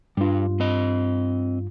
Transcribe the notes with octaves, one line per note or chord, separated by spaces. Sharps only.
G2 G3 D4 F4
C4 D#5